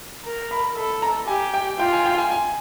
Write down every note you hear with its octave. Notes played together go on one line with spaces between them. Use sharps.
A#4
B5
A4 B5
A#5
G4 G#5
G5
F4 G5
G#5
G5
G#5
G#5